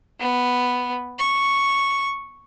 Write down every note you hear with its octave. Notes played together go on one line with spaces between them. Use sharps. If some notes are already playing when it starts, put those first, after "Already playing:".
B3
C#6